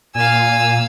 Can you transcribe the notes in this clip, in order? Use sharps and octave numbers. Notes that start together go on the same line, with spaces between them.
A#2 F5 G#5 E6